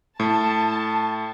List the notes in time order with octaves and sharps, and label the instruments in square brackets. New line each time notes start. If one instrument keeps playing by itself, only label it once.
[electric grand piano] A2 [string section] A5